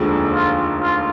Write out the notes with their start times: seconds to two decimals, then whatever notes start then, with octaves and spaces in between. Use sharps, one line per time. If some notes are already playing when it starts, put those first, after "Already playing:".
Already playing: F1 D#2 D3 F3 G#3
0.33 F4
0.81 F4